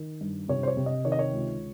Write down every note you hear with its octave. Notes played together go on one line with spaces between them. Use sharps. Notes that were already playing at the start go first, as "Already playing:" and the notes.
Already playing: D#3
G2
C3 C#5
C5
C#5
C3
D#5
D#3 C#5
D#5
C#5
C#2